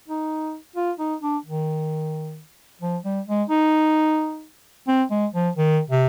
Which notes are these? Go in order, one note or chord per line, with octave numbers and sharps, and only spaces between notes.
D#4
F4
D#4
D4
D#3
F3
G3
G#3
D#4
C4
G#3
F3
D#3
C3